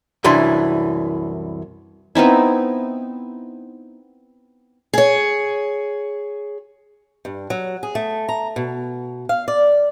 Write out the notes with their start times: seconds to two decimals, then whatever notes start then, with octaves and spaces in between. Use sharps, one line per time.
0.24 C2 F#2 E3 D4 E4 C6
2.15 B3 C4 D#4 E4
4.94 G#4 C#5
7.25 G2
7.50 F#3
7.83 G#4
7.95 A3
8.29 A#5
8.56 B2
9.29 F5
9.48 D5